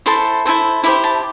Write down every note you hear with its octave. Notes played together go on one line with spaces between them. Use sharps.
E4 A4 C5 C6
E4 A4 C5
E4 G4 C5 B5
A5